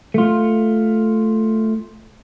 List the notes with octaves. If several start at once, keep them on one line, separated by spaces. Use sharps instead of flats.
A3 F4